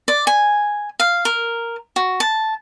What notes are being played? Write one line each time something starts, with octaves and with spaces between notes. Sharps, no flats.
D5
G#5
F5
A#4
F#4
A5